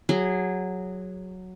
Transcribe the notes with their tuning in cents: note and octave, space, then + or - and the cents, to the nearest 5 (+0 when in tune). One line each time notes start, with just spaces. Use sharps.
F#3 +0 G#4 -15